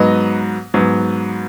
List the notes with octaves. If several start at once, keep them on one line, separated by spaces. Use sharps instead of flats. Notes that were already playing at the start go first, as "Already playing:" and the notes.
Already playing: G#2 F#3 B3 B4 D#5
G#2 F#3 B3